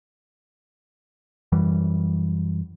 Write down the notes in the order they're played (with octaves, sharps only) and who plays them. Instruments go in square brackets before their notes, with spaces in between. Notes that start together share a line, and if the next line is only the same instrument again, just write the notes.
[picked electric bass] F#2 E3 G3